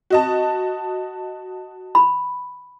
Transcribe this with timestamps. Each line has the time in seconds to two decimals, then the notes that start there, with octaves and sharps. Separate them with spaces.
0.10 F#4 D#5 A5
1.95 B5